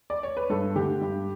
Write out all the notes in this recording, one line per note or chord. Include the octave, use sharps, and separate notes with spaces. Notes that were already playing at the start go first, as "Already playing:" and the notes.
D5
C#5
B4
G2 A4
D3 A3 G4
G2